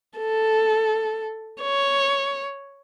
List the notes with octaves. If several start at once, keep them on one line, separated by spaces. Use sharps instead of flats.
A4
C#5